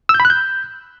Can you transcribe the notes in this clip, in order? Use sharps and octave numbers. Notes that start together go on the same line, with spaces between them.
E6
G6
B5
F#6
G6